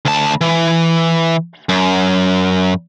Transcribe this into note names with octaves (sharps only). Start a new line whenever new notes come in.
D2 A5
E3
F#2